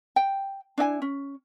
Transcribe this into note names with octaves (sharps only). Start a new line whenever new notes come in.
G5
D4 E4 D#5 G#5
C#4